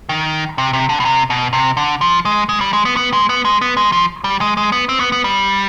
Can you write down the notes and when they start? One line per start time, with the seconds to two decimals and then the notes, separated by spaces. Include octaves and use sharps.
0.09 D#3
0.58 C3
0.73 C3
0.89 D3
1.00 B2
1.05 C3
1.30 B2
1.53 C3
1.77 D3
2.01 F3
2.25 G#3
2.49 G#3
2.61 G3
2.73 G#3
2.85 B3
2.97 B3
3.13 G#3
3.29 B3
3.45 G#3
3.61 B3
3.77 G#3
3.92 F3
4.24 G3
4.41 G#3
4.57 G#3
4.72 B3
4.89 C4
5.00 B3
5.12 B3
5.24 G3